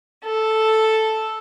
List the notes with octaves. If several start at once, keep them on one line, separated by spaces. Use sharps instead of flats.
A4